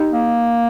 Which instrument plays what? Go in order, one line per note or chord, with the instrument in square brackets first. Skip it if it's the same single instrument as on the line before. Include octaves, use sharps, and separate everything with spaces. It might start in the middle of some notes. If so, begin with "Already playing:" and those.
Already playing: [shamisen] D#4 G4
[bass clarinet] A#3